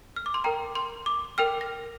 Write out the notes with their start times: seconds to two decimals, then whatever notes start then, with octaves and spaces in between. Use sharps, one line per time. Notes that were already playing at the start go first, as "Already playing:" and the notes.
0.16 F6
0.26 D6
0.34 C6
0.44 A#4 G5 A#5
0.75 C6
1.06 D6
1.38 A#4 G5 F6
1.61 A#6